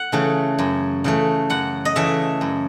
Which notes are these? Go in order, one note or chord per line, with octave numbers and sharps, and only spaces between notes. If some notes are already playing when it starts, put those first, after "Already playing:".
Already playing: F#5
C#3 E3 A3
F#2
C#3 E3 A3
F#2 F#5
D#5
C#3 E3 A3 E5
F#2